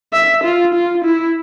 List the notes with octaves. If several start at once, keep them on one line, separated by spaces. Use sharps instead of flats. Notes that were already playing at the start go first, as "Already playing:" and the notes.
E5
F4
F4
E4